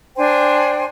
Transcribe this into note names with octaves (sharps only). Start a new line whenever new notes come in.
D4 C5 G5 G#5